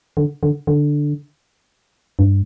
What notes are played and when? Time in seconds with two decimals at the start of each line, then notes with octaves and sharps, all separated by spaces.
0.17 D3
0.43 D3
0.67 D3
2.19 G2